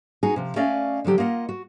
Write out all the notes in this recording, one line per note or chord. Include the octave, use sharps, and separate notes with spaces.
D#4 F#4 G#4
C3 F3
A3 C#4 D5 D#5 F5
D3 F3 F#3 G4
A#3 F4 D#5 F#5
F#4